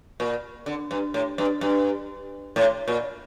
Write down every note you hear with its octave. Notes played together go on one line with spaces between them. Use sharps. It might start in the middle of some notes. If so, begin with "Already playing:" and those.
A#2
D3
G2
A2
G2
G2
A2
A#2